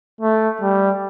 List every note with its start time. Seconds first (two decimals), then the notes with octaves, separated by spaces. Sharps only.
0.21 A3
0.62 G3